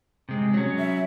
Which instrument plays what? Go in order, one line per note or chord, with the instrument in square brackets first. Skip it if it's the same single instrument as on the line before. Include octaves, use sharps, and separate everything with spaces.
[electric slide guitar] C3 G#3
F#3 C#4
[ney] E5